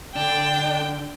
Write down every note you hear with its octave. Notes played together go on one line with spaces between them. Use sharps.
D3 D4 G5